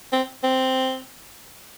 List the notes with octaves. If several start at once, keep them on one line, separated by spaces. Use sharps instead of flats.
C4
C4